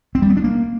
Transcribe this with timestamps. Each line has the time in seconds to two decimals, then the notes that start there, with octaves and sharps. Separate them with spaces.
0.15 C4
0.22 G3
0.29 B3
0.37 D4
0.44 A#3